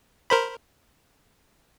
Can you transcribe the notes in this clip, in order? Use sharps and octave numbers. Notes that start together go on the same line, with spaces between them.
A#4 C5 B5